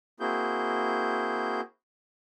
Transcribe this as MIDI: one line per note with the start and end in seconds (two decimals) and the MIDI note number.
0.20 1.61 58
0.20 1.61 60
0.20 1.61 64
0.20 1.61 66
0.20 1.61 68
0.20 1.61 91